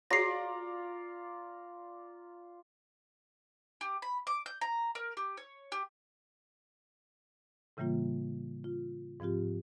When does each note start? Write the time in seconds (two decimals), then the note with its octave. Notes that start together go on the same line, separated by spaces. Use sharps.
0.11 F4 F#4 G#4 C#5 D5 A#5 A#6 C7
3.81 G4
4.02 B5
4.27 D6
4.46 G6
4.61 A#5
4.95 A#4
5.17 G4
5.37 C#5
5.72 G4
7.77 A2 C#3 E3 G3 A#3 F4
8.64 F4
9.20 G#2 F3 C4 F4 G4